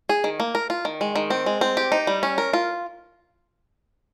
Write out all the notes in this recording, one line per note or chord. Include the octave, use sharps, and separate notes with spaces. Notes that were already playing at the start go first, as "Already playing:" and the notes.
G#4
D#3
A#3
A#4
F4
D#3
G#3
D#3
C4
G#3
C4
G4
D#4
G3
C#4
A#4
F4